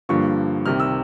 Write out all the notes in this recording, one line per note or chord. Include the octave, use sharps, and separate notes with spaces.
G2 D3 F3 A#3 C#6
C2 C3 D#3 F6
E6